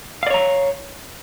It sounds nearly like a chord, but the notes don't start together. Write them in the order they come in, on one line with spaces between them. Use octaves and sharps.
F5 D5 C#5 A#5